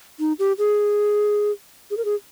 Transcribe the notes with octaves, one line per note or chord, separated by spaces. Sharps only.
D#4
G4
G#4
G#4
A#4
G#4